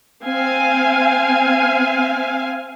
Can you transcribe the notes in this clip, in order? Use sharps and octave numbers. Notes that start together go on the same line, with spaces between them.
C4 F5 G#5